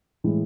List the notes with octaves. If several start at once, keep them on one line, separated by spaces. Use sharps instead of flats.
A2 E3 G#3